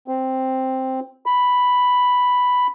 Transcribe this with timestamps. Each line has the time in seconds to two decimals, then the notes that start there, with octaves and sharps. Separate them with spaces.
0.08 C4
1.26 B5